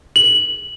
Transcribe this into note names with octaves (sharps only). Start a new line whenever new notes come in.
F#7